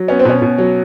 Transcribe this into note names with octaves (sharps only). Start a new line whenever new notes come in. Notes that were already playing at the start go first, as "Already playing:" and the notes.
Already playing: F#3
B3 C#4
C4
B2 C#4
B2
F#3